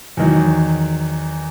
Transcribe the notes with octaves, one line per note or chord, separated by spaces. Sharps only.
E2 D#3 F#3